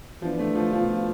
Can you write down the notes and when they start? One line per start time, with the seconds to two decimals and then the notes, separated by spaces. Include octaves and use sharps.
0.21 E3 F3 B3 D4
0.39 A3
0.55 F3
0.72 B2 F3 B3 F4